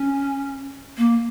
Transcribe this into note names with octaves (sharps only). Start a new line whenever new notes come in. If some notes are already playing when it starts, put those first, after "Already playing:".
Already playing: C#4
A#3